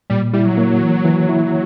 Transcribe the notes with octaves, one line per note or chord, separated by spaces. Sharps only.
A#2 G3
G3 E4
F#3
A#3
E3
E3
E4